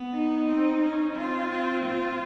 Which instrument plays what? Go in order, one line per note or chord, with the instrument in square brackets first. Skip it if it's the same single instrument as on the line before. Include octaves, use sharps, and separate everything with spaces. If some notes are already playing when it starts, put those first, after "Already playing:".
Already playing: [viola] B3
[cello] D#4
[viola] C4
C#4
[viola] C4 [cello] F4
[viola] C4
[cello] F4